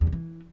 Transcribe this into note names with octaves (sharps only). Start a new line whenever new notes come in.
E2
C3
E3